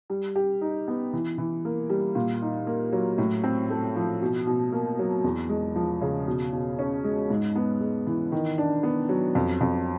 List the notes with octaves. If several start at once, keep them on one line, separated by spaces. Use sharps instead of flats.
G3
G4
D#4
B3
E3
E3
A#3
G3
A#2
D#4
A#3
F#3
A2
C4
A3
F3
B2
B2
A#3
F#3
E2
G#3
F3
C#3
B2
B2
C#4
G#3
G#2
B3
G#3
E3
D#3
D4
B3
F#3
F2
F2